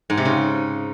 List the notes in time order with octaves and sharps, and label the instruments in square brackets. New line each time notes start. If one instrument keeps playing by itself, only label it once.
[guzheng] G#2
C3
C#3